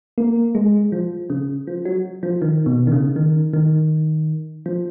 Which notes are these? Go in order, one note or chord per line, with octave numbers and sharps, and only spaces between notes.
A#3
G#3
F3
C#3
F3
F#3
F3
D#3
B2
D#3
C#3
D#3
D#3
F3